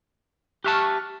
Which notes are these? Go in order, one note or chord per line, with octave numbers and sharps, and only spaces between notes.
G4 E5 A5 C#6 F6 F#6